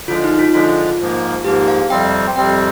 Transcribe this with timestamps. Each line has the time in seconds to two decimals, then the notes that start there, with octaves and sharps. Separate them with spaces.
0.08 D3 F3 G#3 F4
0.24 D#4
0.39 F4
0.53 D3 F3 G#3 F4
0.99 G#2 F3 A#3
1.44 G#2 F3 A#3 G4
1.68 F5
1.90 F2 C3 G3 C4 G5
2.36 F2 C3 G3 C4 G5